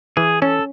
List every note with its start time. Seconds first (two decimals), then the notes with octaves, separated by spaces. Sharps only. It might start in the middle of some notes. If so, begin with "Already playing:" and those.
0.17 E3 G#4
0.42 C#4 A4